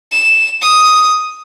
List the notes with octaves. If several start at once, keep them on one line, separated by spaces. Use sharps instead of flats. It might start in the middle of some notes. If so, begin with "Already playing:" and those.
E7
D#6